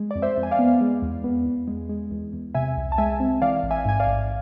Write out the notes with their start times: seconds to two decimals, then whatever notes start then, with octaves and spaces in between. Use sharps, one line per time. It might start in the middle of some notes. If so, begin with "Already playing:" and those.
Already playing: G#3
0.11 F2 D5
0.22 C5 E5
0.37 F2
0.43 G#5
0.51 D5 F5
0.59 B3
0.81 G#3
1.02 E2
1.24 B3
1.46 E2
1.68 G#3
1.89 G#3
2.11 E2
2.33 E2
2.55 C3 E5 G#5
2.77 C2
2.92 A5
2.98 G#3 E5 G#5
3.20 C4
3.42 E3 D5 F5
3.63 A1
3.71 E5 G#5
3.85 G#2 G#5
4.00 D5 F5
4.07 A1